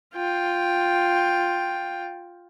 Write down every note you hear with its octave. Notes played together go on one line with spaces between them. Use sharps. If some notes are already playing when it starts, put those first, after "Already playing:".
F4 G5